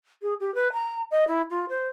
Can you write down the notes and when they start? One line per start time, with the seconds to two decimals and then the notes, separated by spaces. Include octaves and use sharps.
0.22 G#4
0.40 G4
0.55 B4
0.73 A#5
1.11 D#5
1.28 E4
1.50 F4
1.69 C5